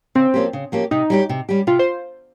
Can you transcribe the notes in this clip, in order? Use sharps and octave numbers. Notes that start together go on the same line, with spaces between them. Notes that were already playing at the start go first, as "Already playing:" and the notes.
C#3 C4
F3 A#3 C#4 G4
C#3
F3 A#3 C#4 G4
C3 D#4
G3 C#4 G4
C3
G3 C#4 G4
C3 F4
C5